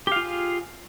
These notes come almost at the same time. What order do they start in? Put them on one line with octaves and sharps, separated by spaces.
G4 F5 F4 G#4